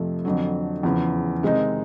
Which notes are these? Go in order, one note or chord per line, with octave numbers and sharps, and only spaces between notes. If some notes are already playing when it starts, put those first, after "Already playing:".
Already playing: F2 C3 F3 A3
F2 D3 F#3
E2 C#3 F3
C3 D#3 G#3 C4 D#4